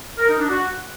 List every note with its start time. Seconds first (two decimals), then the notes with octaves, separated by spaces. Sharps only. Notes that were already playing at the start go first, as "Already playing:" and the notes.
0.18 A#4
0.28 D#4
0.39 D4
0.49 F#4